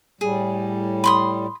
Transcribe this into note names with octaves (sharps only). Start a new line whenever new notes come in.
A2 G3 G#4
B5 C6 D#6